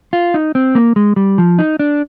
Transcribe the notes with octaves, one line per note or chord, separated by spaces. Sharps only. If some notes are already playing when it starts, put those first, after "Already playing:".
F4
D#4
C4
A#3
G#3
G3
F3
D#4
D4